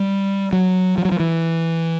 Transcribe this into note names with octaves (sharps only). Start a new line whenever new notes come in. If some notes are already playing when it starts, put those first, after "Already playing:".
Already playing: G3
F#3
F3
F#3
F3
E3